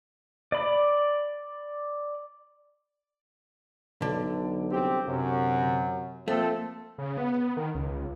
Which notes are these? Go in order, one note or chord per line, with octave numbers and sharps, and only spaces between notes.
D5 B5
B1 D3
C2 C4 G4
F#2 C3 F#3
F3 A3 A#3 C4 A4
C#3
B3
D#3
C#2